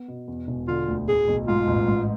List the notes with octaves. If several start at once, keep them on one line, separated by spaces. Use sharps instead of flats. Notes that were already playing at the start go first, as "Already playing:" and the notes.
Already playing: B3
B2
E2
E1
D3 F4
D2
A2 G#4
B1
G#2 F4
A1
G#2